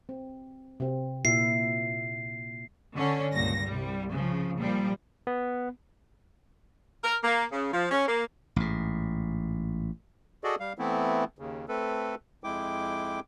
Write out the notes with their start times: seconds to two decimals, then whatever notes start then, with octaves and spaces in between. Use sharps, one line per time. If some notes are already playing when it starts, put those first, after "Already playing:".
0.09 C4
0.80 C3 C4
1.25 A#2 E4 E5 C7
2.95 D3 C#4
3.34 C#2 G2 A#2 A#6
3.65 C2 G3
4.11 C#3 F3
4.57 A#2 F3 G3
5.27 B3
7.04 A#4
7.24 A#3
7.52 C#3
7.73 F3
7.91 C#4
8.08 A#3
8.56 A1 G#2
10.44 F#4 G#4 A4 D5 D#5
10.60 G3 F5
10.79 E3 A3 B3 C4 E4
11.39 D#2 C#3
11.68 A3 C4 A4 B4
12.44 F2 G#3 E4 G5 D6